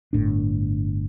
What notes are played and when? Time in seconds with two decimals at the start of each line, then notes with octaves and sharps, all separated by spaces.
0.13 G1 A2 D4